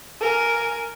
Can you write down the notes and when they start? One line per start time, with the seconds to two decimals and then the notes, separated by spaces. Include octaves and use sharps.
0.20 A#4 G#5